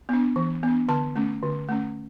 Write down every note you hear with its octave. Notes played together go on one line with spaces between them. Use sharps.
B3 D4
E3
B3 D4
D3 A5
A3 C#4
D3
A3 C#4